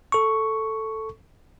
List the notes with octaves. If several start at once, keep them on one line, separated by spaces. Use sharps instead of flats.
A4 C#6